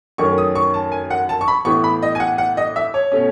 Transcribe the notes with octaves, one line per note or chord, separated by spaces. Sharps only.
F#2 D#3 A3 C#4 C#6
D#6
C#6
A5
G#5
F#5
A5
C#6
B5
A2 E3 B3 C#6
B5
D#5
G#5
F#5
F#5
D#5
E5
C#5
B2 A3 C#4